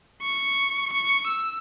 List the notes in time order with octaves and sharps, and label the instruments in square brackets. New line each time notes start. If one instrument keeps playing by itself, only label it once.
[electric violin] C#6
C#6
E6